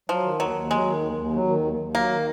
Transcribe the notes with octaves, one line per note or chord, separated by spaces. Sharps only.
F3 F#3
D#3
D#2 F#3
D#2
F#3 G#3
D#3
D#2
D#2
F#3
D#3
D#2
D#2
F#3 A#3
D#3